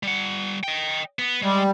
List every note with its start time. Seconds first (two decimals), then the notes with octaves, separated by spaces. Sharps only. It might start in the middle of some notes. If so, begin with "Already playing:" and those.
0.03 G3 F#5
0.63 D#5 G5
1.19 B3
1.42 G3 G#3